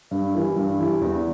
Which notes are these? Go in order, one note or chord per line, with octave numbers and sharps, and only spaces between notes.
G2
E3 G3 E4
G2
E3 G3 E4
E2